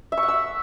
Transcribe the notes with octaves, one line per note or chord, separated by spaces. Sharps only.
E5
C#6
F#5
E6
E5